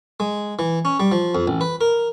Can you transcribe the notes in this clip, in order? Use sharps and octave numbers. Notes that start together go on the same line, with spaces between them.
G#3
E3
C#4
G3
F3
F2
A1
B4
A#4